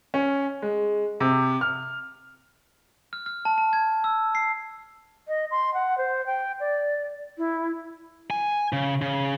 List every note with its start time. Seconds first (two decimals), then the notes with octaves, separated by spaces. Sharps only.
0.14 C#4
0.62 G#3
1.20 C3
1.61 F6
3.13 F6
3.26 F6
3.45 A5
3.58 A5
3.73 G#6
4.04 E6
4.35 C7
5.28 D#5
5.51 C6
5.74 F#5
5.98 C5
6.26 G5
6.60 D5
7.38 E4
8.30 G#5
8.73 C#3
9.02 C#3